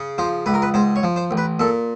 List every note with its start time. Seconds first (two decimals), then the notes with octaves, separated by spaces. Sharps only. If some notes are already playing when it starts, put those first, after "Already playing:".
Already playing: C#3
0.18 F3 C5
0.46 C#2 B4
0.54 A#4
0.62 B4
0.74 G#2 C5
0.96 C#5
1.03 F3
1.16 C5
1.31 A1
1.37 B4
1.60 A#2 A4